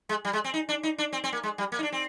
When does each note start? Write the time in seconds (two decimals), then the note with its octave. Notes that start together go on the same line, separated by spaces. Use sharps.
0.09 G#3
0.25 G3
0.33 G#3
0.44 C4
0.54 D#4
0.69 D4
0.83 D#4
0.98 D4
1.13 C4
1.24 C4
1.33 A#3
1.43 G#3
1.58 G3
1.72 A#3
1.79 D#4
1.83 D4
1.92 C4